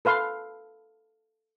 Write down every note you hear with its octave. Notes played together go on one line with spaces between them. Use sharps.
A4 B4 F5 C6